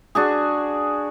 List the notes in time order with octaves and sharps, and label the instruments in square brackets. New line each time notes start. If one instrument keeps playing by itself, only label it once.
[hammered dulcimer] D4 F#4 G#4